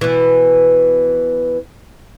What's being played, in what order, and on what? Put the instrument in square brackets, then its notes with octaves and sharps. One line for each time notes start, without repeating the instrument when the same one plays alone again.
[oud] B2 E3